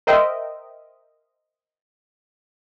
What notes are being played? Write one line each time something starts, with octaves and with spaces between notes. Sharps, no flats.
A#4 C5 D#5 E5 G5